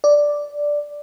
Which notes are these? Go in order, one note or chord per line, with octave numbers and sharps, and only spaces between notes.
D5